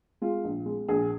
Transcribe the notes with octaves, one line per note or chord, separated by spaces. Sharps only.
G#3 F4
A#1
G#3
A#1 G#4